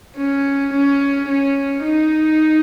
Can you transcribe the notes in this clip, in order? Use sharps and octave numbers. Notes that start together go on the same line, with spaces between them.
C#4
C#4
C#4
D#4